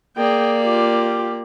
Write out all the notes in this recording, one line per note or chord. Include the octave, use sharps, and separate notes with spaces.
A#3 G#4 D5 G5
F4 G4